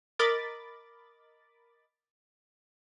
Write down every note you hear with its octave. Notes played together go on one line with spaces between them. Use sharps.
A#4 D#5 B5 D6 A6